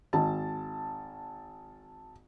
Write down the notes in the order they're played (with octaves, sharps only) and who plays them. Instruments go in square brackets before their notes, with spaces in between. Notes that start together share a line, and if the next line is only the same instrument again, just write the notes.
[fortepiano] G#1 [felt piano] A5